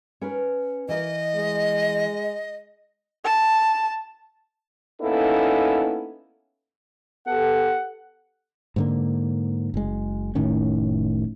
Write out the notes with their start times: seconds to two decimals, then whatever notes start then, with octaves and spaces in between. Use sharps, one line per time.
0.21 C#4 A#4 B4
0.89 E3 A#4 D#5
1.36 G#3
3.25 A5
5.01 A#3 B3 C#4 D#4 E4 A4
7.27 B3 G4 A4 F#5
8.76 G#2 D3 A#3
9.74 F#1 G#3
10.35 F1 A2 D#3 C#4